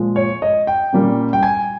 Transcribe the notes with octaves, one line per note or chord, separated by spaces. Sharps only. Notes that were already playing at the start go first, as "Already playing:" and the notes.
Already playing: A#2 F3 G#3
C#5
D#5
G5
A#2 G3 A#3 C#4
G5
G#5